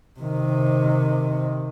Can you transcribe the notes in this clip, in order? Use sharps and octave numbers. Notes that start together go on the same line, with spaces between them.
C3 D#3